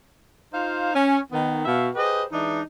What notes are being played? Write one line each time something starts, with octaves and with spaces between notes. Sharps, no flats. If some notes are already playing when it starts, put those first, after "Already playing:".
D#4 F4 C5 F5
C#4
D#3 B3
B2 F#4 E5 F5
G4 G#4 B4 C5 D#5
E3 G#3 D4 D#4